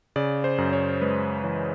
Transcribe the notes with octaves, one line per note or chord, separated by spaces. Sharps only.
C#3 D5
C5
F#2
C#5
G#3 B4
E3 C#5